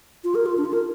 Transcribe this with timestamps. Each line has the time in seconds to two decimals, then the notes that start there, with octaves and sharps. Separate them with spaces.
0.24 F4
0.35 A#4
0.46 F4
0.57 D4
0.65 F4
0.73 A#4